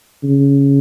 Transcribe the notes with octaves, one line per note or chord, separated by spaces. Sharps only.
C#3